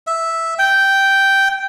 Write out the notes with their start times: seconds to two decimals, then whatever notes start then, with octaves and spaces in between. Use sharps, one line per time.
0.07 E5
0.59 G5